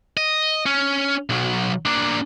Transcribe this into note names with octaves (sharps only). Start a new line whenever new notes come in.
D#5
C#4
B1 F#3
A#3 D4